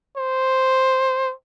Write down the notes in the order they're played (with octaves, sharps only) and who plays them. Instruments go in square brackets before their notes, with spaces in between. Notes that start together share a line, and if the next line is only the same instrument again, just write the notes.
[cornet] C5